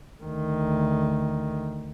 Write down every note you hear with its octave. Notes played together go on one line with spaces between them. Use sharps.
D2 D#3